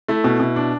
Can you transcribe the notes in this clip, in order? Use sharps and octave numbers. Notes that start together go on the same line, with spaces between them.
A3 E4
B2
B2
D4